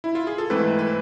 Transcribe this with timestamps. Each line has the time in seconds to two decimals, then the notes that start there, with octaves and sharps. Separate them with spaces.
0.04 E4
0.15 F4
0.27 G#4
0.38 A4
0.50 G#2 E3 A3 C4 B4
0.79 B4